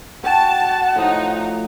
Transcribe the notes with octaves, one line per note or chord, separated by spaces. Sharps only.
F#4 F#5 G5 A5 C#6
A2 F3 D#4